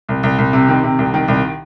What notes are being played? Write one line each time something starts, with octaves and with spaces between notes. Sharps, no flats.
C2
C2
C2
C3
D#3
C3
C2
D#3
C2